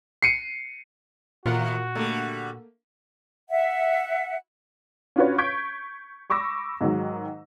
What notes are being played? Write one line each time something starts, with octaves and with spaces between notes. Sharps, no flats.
C7 C#7 D#7
D#2 A#2 F4 F#4 A#4 F#5
D3 G3 A3 A#3
E5 F#5
C#4 D4 F4 F#4 B4 C#5
C#6 G6 G#6 B6 D7
B5 C#6 D6 E6 A#6
G#2 D#3 F#3